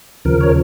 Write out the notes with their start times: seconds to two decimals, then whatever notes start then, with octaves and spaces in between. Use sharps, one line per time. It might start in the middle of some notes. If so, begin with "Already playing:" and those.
0.25 D#2 C#3 F3 A#4
0.41 C#5